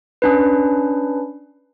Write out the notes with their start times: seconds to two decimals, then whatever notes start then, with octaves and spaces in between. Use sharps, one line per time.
0.22 C#4 D4 B4